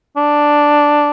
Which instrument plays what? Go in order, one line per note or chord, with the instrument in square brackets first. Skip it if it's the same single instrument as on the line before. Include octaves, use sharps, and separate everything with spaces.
[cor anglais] D4